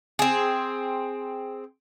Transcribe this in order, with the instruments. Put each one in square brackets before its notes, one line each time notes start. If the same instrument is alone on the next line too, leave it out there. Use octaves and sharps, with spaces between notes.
[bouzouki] C4 G#4